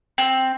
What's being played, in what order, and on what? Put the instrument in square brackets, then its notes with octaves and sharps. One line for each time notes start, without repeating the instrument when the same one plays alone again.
[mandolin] C4